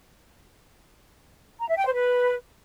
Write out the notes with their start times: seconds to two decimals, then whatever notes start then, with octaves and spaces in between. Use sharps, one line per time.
1.60 A#5
1.68 E5
1.77 G5
1.85 C5
1.93 B4